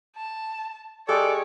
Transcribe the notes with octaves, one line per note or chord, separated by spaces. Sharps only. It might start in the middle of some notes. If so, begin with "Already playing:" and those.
A5
G#3 G4 A4 C#5 D5